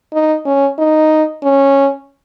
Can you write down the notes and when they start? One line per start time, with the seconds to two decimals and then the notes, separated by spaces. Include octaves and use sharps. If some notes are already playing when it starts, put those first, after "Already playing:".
0.13 D#4
0.46 C#4
0.78 D#4
1.43 C#4